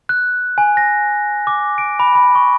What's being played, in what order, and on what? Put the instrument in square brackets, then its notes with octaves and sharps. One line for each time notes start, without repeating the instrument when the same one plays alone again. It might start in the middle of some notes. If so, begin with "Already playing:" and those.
[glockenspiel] F#6
G#5
A#6
D6
D7
B5
B5
C#6